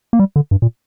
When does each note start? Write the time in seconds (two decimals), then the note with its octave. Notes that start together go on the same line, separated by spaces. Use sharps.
0.13 A#3
0.20 G3
0.36 D3
0.51 G2
0.62 A#2